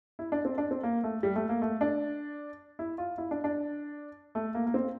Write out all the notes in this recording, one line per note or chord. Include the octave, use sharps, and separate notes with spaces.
E4
D4
C4
D4
C4
A#3
A3
G3
A3
A#3
A3
D4
E4
F4
E4
D4
D4
A3
A#3
A#3
C4